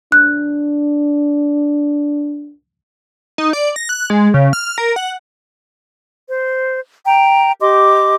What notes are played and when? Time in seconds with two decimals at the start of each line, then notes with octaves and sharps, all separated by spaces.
0.12 D4 F#6
3.38 D#4
3.53 D5
3.76 A#6
3.89 F#6
4.10 G#3
4.34 C#3
4.53 F6
4.78 A#4
4.96 F#5
6.29 C5
7.06 G5 A#5
7.61 G4 D#5 C6 D6